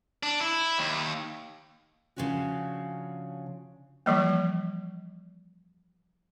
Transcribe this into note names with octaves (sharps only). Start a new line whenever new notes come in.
D4
E4
D#2
C#3 F3 C#4 D4 F#4
E3 F3 G3 A#3